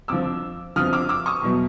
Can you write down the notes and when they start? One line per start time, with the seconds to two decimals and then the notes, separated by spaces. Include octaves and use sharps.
0.08 F2 D3 F3 D6 E6
0.76 F2 D3 F3 D#6 F6
0.93 D6 E6
1.09 D6 E6
1.26 C#6 D#6
1.42 E2 B2 F#3